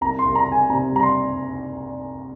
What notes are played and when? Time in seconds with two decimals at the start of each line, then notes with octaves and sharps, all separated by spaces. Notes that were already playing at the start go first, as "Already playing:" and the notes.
0.01 C2 A#5
0.19 C6
0.25 C2
0.35 A#5
0.46 C2
0.52 G#5
0.70 C3 A#5
0.91 G3 A#5
1.03 C6